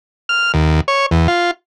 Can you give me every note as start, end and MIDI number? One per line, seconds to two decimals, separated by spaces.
0.29 0.52 89
0.54 0.80 39
0.88 1.06 73
1.11 1.27 40
1.28 1.51 65